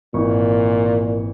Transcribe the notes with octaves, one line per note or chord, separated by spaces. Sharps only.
G#1 A#2 E3 C#6